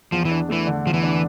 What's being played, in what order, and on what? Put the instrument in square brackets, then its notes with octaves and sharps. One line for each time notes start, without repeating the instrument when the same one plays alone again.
[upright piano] E2 [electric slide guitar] F3
[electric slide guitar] E3
[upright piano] D4
[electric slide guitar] E3 [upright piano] A3
[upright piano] D3
[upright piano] E2 [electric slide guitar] F3
[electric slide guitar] E3
[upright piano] D4